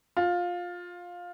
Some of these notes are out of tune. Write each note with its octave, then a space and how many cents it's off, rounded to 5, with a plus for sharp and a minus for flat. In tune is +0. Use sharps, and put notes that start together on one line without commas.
F4 +15